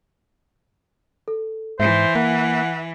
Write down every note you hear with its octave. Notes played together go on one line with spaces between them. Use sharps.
A4
G#2 E3 C5 E5
A#3 F#5